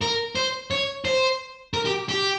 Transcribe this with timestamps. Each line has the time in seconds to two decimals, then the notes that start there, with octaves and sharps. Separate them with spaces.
0.01 A#4
0.35 C5
0.71 C#5
1.05 C5
1.74 A#4
1.85 G4
2.09 G4